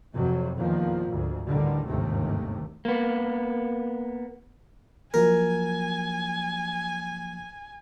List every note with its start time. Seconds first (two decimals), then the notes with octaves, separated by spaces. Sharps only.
0.13 F2 C3 F#3
0.57 E2 A#2 D#3 F3
1.10 D2 G#2
1.48 A1 A2 D3 D#3 G3
1.87 G1 D#2 G#2 C3 D#3 A3
2.85 A#3 B3
5.14 F3 F#3 A#3 A#4 G#5